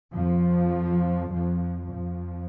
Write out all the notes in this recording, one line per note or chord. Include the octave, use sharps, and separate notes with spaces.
F2 F3
F2 F3
F2 F3